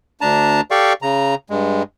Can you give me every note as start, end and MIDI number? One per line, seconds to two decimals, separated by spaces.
0.21 0.61 38
0.21 0.61 62
0.21 0.61 81
0.21 0.61 82
0.71 0.93 67
0.71 0.93 69
0.71 0.93 74
0.71 0.93 77
0.71 0.93 79
0.71 0.93 85
1.02 1.35 49
1.02 1.35 82
1.50 1.83 43
1.50 1.83 56